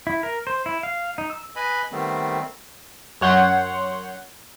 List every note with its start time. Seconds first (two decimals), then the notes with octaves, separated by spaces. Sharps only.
0.07 E4
0.23 A#4
0.47 C5
0.66 E4
0.83 F5
1.18 D#4
1.30 E6
1.56 B4 D#5 G#5 B5
1.92 D#3 G3 A3 B3 C4
3.21 F#2 C#5 F#5 C6 G6